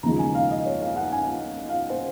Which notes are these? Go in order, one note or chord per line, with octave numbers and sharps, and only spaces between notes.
D#2 C#3 F3 G#3 A#5
G#5
F5
D#5
C#5
F5
F#5
G#5
G#5
F5
C5